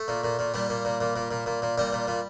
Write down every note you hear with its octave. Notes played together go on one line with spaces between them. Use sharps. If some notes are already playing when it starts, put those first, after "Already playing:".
Already playing: A3
A#2
A#2
A#2
A#2 G3
A#2
A#2
A#2
A#2
A#2
A#2
A#2
A#2 G3
A#2
A#2